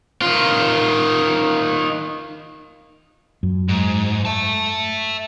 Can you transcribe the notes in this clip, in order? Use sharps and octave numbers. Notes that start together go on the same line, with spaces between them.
D#3 F4
F#2
G#2
E5 A5